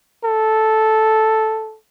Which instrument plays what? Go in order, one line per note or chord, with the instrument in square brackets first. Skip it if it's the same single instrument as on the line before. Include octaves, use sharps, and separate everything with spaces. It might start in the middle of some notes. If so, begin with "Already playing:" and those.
[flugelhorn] A4